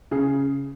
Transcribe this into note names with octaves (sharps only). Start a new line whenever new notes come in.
C#3 G#4